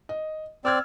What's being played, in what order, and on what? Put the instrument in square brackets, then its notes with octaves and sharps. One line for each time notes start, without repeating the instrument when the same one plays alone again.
[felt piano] D#5
[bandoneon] C4 D5 [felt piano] E6 F6 G#6